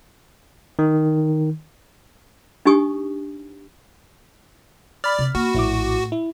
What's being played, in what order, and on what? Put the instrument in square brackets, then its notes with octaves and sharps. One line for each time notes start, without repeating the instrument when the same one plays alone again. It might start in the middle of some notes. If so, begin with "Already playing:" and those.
[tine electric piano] D#3
[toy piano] D4 D#4 G4 G#5 C#6 D#6
[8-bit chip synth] D5 [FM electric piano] B5 F6
[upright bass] C3
[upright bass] A#3 [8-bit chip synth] F#4
[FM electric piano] A#1 E4 D6 [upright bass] A2
[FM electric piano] E4